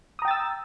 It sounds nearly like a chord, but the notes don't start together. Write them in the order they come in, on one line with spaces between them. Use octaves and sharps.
D#6 A#5 G5 A6 E6